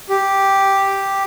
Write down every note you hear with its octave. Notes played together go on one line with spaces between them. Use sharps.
G4